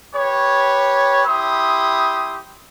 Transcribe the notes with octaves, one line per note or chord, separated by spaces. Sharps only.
G4 B4 C#5
E4 G4 C6 D#6